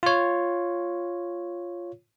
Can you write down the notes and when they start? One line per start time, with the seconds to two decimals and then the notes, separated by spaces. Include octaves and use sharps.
0.03 F4 C#5